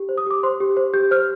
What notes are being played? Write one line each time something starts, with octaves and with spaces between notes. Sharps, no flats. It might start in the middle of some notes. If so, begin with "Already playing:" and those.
Already playing: G4
C5
D#6
G4 D6
C5 C6
G4
C5
G4 G6
C5 F6